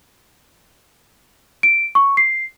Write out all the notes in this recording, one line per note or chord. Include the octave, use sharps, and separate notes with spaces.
D7
C#6
C7